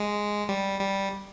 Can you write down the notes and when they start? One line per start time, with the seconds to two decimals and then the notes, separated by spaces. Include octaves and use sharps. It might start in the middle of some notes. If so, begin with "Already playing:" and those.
Already playing: G#3
0.49 G3
0.80 G3